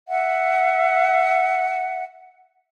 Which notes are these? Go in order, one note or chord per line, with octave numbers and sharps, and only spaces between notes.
E5 F#5